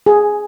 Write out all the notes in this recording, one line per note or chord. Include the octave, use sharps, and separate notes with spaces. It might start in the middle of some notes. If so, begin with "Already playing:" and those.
G#4